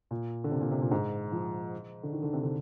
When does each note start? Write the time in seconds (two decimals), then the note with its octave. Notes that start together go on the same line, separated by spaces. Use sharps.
0.11 A#2
0.44 D3
0.51 C3
0.61 A#2
0.72 C3
0.82 A#2
0.91 G#2
1.32 F3
2.03 D3
2.13 D#3
2.23 D3
2.33 C3
2.43 D3